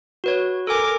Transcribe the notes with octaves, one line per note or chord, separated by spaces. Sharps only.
F#4 B4 C#5
A4 A#4 G#5 D6